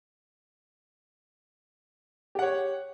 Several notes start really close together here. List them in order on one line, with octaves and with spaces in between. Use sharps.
G4 F#5 C#5